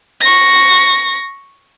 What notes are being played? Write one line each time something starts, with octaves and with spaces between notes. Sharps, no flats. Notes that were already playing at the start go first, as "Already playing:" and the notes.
C#6 A#6